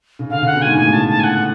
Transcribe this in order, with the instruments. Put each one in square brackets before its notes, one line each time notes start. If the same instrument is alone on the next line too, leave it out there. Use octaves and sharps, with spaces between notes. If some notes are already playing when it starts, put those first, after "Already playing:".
[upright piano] C#3
[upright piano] D3 [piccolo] F5
[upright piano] C#3 [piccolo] F#5
[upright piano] B2
[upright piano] G#2 [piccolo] G#5
[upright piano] A2 [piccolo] G#5
[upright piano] B2
[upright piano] A2 [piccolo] A5
[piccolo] A5
G#5
F#5